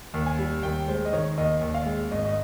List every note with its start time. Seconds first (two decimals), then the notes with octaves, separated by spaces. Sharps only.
0.14 D#2
0.26 G#5
0.39 G3
0.63 D#2 G5
0.88 G#3 C5
1.05 D#5
1.13 D#3 C#5
1.38 D#2 D#5
1.61 D#2
1.74 F5
1.86 G#3
2.11 G#1 D#5
2.25 D#5